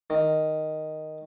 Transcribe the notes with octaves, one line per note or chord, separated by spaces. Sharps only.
D#3